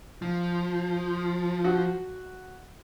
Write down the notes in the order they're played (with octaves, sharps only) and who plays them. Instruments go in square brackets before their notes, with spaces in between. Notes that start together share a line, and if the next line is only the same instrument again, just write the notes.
[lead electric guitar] F3
[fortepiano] F#4